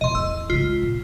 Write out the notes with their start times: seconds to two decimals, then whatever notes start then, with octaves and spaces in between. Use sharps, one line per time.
0.01 E2 B2 D#5 C6
0.15 D1 E2 E6
0.50 C#3 G#3 F4
0.83 A#2